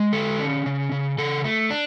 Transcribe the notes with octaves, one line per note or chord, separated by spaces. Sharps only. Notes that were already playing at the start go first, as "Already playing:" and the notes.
Already playing: G#3
D3 A4
C#4
C#3
C#3
C#3 A4
A3
D4